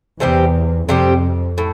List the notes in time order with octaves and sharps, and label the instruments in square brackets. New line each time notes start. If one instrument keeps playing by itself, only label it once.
[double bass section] E2 [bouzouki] C3 G3 C4 G4
[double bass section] F2 [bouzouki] C3 G3 C4 G4
[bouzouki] A2